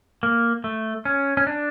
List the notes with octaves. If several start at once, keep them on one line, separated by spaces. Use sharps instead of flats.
A#3
A3
C#4
C#4
D4